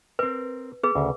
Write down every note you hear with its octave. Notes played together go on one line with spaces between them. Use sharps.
C4 A#4 B4
B3 G#4 B4
D2 C#3